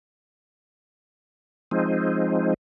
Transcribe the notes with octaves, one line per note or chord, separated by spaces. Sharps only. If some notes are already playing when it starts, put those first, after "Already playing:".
F3 G#3 C4 D#4